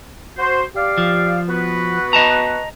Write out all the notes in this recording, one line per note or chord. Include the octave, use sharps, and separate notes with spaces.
F#4 C5
G4 D5 F5
F3
B3 F#4 B4
D#5 A5 A#5